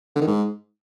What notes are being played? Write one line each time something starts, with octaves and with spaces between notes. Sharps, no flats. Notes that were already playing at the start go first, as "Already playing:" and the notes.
D3
D#3
G#2